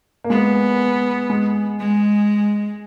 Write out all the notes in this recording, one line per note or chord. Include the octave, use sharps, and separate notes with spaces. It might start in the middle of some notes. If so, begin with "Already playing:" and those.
A#3
G#3 B3
G#3
G#3